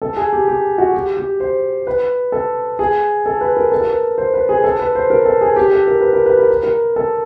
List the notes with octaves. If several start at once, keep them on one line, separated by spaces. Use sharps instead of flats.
A4
G#4
G4
G4
F#4
G4
G4
C5
B4
A4
G#4
A4
B4
A#4
A4
A#4
B4
C5
B4
G#4
A4
B4
C5
A#4
A4
G#4
G4
A4
A#4
B4
A#4
B4
A#4
B4
A#4
A4